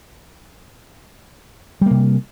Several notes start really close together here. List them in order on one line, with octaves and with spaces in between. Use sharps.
G3 A#3 C3